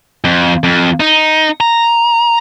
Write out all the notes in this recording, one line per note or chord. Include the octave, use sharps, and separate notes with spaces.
F2
F2
D#4
A#5